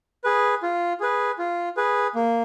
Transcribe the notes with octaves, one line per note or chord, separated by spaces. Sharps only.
G#4 B4
F4
G#4 B4
F4
G#4 B4
A#3